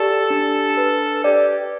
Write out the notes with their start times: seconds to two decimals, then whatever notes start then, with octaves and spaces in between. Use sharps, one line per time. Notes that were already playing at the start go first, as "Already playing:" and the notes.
Already playing: G4 A4 D5
0.30 D4
0.77 B4
1.24 G4 D5